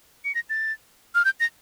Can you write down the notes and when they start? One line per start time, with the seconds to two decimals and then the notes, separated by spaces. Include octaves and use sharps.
0.24 C#7
0.35 A#6
0.50 A6
1.15 F6
1.25 G6
1.40 A#6